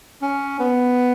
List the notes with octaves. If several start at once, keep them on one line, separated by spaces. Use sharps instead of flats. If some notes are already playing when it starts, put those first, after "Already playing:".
C#4
B3